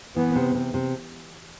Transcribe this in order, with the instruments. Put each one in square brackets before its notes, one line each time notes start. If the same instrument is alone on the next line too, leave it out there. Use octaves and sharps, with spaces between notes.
[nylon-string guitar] E3 [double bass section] B3
[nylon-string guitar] C3
C3
C3